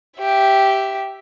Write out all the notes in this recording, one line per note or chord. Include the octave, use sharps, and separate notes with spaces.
G4 E5